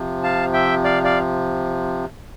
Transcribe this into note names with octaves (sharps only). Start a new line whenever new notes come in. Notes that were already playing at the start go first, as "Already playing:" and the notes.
Already playing: C3 F3
F5 A5
E5 G5
D5 F5
D5 F5